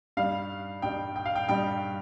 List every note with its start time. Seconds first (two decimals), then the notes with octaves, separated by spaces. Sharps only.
0.17 G2 G3 D#4 F5
0.82 G2 G3 D#4 G5
1.16 G5
1.25 F5
1.35 G5
1.48 G2 G3 D#4 G5